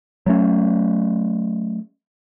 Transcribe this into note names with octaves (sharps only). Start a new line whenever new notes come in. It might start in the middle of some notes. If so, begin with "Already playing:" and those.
F#3 A3 C#4